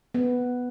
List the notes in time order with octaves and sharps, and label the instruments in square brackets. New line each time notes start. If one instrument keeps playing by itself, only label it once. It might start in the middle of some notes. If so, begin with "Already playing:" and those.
[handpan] B3